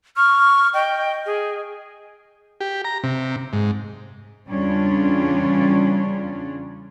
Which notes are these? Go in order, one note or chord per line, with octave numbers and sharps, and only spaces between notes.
C#6 F6
D#5 G5
G#4
G4
A#5
C3
G#2
E2 C#3 G3 C#4 D4 F4